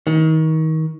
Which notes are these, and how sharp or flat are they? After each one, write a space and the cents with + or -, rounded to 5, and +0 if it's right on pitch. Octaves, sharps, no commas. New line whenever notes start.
D#3 +30